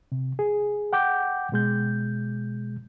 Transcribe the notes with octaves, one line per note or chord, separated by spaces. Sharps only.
C3
G#4
F#5 G5 D6 G6
B2 G#3 G6